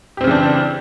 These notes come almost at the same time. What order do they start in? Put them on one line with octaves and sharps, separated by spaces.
G4 C4 C#3 E3 D4